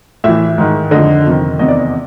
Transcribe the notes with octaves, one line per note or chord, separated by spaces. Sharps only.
A2 E3 E5
G#2 D#3
F2 D3 D#5
F2 C3 D#3
E2 C3 D#3 D#5
D5
D#5